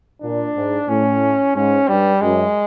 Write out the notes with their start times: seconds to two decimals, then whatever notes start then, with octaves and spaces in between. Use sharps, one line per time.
0.22 A#2 D4
0.55 G#2
0.88 A2 C#4
1.55 G#2 C#4
1.88 G2 G3
2.21 F#2 G#3